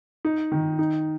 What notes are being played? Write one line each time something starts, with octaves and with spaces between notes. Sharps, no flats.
D#4
D#3
D#4